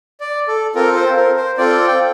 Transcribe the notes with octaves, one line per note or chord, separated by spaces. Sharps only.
D5
A4
C4 F4 A4 A#4
C5
A#4
C5
C4 F4 A4 D5
G5